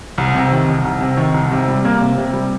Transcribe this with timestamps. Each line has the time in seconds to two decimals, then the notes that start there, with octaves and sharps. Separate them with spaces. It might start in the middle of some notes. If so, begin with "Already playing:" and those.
0.18 C2
0.35 C3
0.51 D#3
0.68 C2
0.85 C2
1.01 C3
1.17 D#3
1.34 C2
1.51 C3
1.68 G3
1.85 A#3
2.01 C3
2.18 C3
2.33 G3